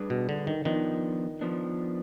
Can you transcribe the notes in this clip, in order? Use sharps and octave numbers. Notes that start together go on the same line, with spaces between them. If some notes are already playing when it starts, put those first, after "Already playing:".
Already playing: G3 D4 G#4 B4
B2
D3
D#3
D#3 F3 B3 D4
F3 B3 D4